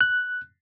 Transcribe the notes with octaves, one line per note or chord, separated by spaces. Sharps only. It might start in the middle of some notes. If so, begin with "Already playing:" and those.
F#6